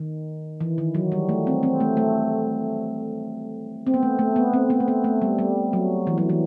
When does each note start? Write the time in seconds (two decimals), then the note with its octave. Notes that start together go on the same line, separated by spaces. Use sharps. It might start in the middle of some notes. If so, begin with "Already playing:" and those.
Already playing: D#3
0.61 E3
0.78 D#3
0.95 F#3
1.12 G3
1.29 A3
1.47 C4
1.63 C4
1.80 A3
1.97 A3
3.87 C4
3.94 B3
4.03 A3
4.19 A3
4.36 B3
4.54 C4
4.70 B3
4.80 A3
4.88 B3
5.04 A3
5.22 G3
5.39 G3
5.73 F#3
6.07 E3
6.18 F#3
6.29 E3